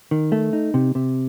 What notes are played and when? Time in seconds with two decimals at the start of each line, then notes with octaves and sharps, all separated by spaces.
0.11 D#3
0.32 A3
0.53 D#4
0.74 C3
0.95 C3